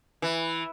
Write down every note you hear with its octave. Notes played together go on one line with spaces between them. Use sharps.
E3